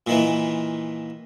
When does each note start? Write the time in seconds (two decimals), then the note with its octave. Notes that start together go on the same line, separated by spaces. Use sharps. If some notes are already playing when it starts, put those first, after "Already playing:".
0.07 A#2 D#3 E3